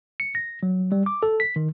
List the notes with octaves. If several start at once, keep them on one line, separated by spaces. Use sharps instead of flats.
C#7
A#6
F#3
G3
D6
A4
B6
D#3